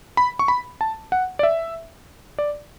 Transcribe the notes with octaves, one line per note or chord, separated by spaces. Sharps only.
B5
C#6
B5
A5
F#5
D5
E5
D5